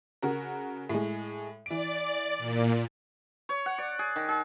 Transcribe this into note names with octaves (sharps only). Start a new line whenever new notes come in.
C#3 F#4 A#4
A2 G#3
E3 D5 D7
A#2
C#5
F#5
D5
G#4
D#3
G#4